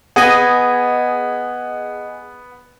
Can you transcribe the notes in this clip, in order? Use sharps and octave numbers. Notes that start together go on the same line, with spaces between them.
B3 G#4 D#5 G#5